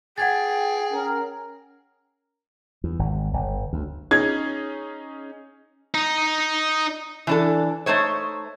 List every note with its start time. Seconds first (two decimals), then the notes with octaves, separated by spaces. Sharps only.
0.18 G#4 F#5 G5 G#6 A6
0.93 C#4 A#4
2.84 E2
2.99 G#1
3.33 G1
3.73 D2
4.11 C#4 D#4 G#4 G#6
5.95 D#4
7.27 E3 D4 A4
7.86 A3 D#4 C5 C#5